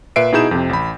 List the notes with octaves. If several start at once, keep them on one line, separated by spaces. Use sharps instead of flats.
A#2 B4 E5 C7 D7
B2 D#4 E4 G#4 G6 E7
F2 C3
A1 B5